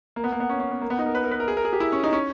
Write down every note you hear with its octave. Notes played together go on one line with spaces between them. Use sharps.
A#3
B3
A#3
B3
C#4
C#4
B3
A#3
B3
D#4
A#4
B4
A#4
B4
A#4
G#4
A#4
G#4
G4
E4
C#4
D#4
C#4